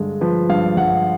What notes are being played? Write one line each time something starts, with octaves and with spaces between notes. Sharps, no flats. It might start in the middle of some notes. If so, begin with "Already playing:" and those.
Already playing: G2 D3 G#3
F3 B4
G2 F5
G2 F#5